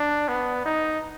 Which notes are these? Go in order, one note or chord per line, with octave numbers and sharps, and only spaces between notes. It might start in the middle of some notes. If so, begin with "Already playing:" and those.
Already playing: D4
B3
D#4